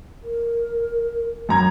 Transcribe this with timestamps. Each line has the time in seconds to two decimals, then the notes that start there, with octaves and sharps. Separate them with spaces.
0.24 A#4
1.49 F#2 A#5 G#6